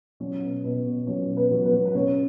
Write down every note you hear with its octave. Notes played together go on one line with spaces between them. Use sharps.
F#3 C#4 C#5
B2
B2 B3 B4
B2
F#3 C#4 C#5
B2
B3 B4
F#3
B3 B4
F#3
B4
C#3 C#4 C#5